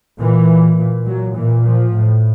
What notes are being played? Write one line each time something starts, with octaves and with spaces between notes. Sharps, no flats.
A#2 E3
A#2
F#3
A#2 E3
F3
A2